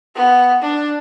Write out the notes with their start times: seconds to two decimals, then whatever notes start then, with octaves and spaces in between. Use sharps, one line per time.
0.15 B3
0.62 D4